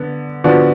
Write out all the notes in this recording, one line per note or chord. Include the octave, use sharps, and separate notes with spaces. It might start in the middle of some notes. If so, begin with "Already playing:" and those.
Already playing: D3 B3
D3 F3 B3 D4 F#4